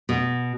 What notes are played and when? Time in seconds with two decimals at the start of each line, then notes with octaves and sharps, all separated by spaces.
0.09 B2